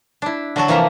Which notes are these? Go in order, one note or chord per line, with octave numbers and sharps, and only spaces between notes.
D4 E4
D3 F#3 F#4 A4
C3 E3 F3 A#3 E5 A#5